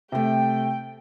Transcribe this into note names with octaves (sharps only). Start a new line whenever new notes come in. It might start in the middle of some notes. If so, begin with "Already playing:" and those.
C3 A3 G5